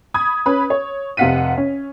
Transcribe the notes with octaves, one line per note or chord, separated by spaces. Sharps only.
B5 D#6 G#6
C#4 B4 B5
C#5
F1 C3 F5 F#5 B6 D#7
C#4